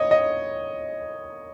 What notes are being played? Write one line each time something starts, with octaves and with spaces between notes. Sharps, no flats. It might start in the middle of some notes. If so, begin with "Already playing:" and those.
Already playing: C#5 D#5
D#5